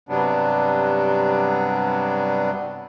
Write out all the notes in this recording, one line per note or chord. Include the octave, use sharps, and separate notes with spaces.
G2 C3 F#3 G3 B3 D4